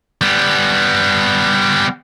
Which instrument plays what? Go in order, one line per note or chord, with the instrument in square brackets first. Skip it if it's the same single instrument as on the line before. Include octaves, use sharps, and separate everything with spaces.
[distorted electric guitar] G3 B3